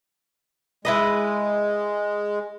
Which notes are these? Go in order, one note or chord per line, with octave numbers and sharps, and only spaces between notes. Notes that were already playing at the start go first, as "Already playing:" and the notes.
G#3 E4 B4 D#5